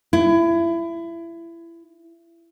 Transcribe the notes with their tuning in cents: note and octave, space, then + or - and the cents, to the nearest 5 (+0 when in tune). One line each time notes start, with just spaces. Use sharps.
E4 +25